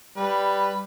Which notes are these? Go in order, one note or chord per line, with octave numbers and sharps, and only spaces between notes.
G3 B4